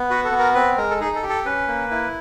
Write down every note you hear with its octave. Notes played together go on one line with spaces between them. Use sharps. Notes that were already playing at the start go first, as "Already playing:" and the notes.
Already playing: B3
F#4 B4
A4
B3
A#4
C4 B4
G#3 A#4
A4
D#4 G#4
A4
G4
A4
C#4 B4
A#3
E4